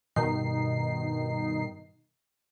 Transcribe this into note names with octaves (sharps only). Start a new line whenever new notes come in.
G2 B2 D#3 D#4 C7